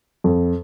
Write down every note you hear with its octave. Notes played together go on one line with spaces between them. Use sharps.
F2